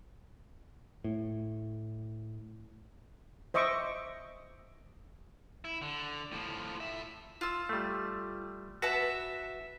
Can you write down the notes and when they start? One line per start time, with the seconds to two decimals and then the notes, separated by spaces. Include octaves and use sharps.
1.04 A2
3.54 C5 D#5 E5 C#6 D6
5.65 E4
5.82 D3
6.32 A2 F3
6.80 A2 E5
7.41 F4 E6
7.69 G3 A3
8.82 F#4 B4 E5 A5